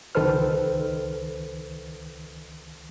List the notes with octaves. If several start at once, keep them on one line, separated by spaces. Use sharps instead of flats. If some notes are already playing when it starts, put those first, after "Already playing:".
C#2 D#3 A4 B4 C5 F6